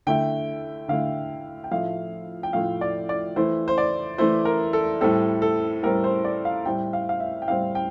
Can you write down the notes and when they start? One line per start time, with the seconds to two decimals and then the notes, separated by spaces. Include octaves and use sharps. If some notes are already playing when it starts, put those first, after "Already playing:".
0.07 D3 A3 E4 G5
0.88 D3 A3 E4 F5
1.64 G5
1.71 A2 F3 A3 E4 F5
2.43 G5
2.53 A2 F3 A3 E4 F5
2.81 D5
3.09 D5
3.36 E3 A3 E4 C5
3.68 C5
3.78 D5
4.18 E3 A3 E4 C5
4.45 A#4
4.73 A4
5.01 A2 G3 C4 A4
5.42 A4
5.83 A2 G3 C4 A#4
6.04 C5
6.25 D5
6.45 F5
6.65 A2 G3 C4 G5
6.93 F5
7.09 F5
7.20 E5
7.42 G5
7.48 A2 G3 C4 F5
7.75 G5